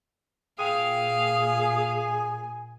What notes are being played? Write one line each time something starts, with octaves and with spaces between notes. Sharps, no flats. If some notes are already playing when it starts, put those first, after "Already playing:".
A#2 G#4 F5 G5
G#5